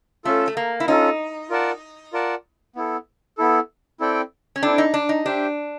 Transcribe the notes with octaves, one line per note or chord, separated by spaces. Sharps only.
A3 C#4 F4 A4
A3
A#3
E4
C#4 D#4 F4 A4
F4 A#4 D5 F#5 A5
F4 A#4 D5 F#5 A5
B3 E4 A4
B3 E4 A4
C4 E4 A4 D5 G5
C#4
C4 D4 E4 A4 D5 G5
D#4
D4
D#4
D4 G4 C5 E5 G5